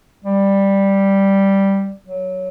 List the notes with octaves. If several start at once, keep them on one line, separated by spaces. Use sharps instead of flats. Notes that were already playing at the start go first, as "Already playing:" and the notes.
G3
F#3